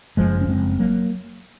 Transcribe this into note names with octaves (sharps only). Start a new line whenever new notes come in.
F#1 F3 G#3
C#4
F#1 G#3 C4
F#3 A#3